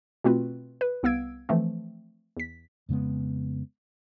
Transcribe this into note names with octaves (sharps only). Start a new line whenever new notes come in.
B2 A3 C4 F4 F#4 B4
B4
C2 B3 F5 E6 G#6 D7
E3 F3 A3 C4
E2 B6
F2 C#3 G#3 B3